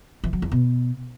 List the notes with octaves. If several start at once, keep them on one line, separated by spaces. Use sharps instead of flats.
E3
F#3
E2
B2